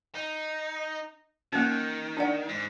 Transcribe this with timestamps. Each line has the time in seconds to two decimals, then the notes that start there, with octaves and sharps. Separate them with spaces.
0.15 D#4
1.53 D#3 A#3 C#4
2.17 D4 D5 F#5
2.49 G#2